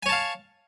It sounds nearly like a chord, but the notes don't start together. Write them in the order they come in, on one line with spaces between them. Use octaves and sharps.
G#5 C#5 A5 F5